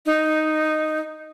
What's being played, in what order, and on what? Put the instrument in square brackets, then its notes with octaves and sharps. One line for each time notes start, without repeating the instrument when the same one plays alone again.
[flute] D#4